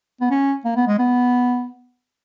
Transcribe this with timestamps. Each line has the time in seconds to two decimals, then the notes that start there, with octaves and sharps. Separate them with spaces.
0.21 B3
0.31 C#4
0.65 A#3
0.76 B3
0.88 G#3
0.99 B3